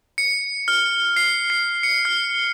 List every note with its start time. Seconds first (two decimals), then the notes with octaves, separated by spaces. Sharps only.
0.18 C#7
0.68 F6
1.16 C7
1.50 C7
1.83 C#7
2.05 F6